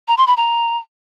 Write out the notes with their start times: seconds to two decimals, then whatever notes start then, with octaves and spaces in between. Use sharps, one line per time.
0.08 A#5
0.17 C6
0.27 B5
0.37 A#5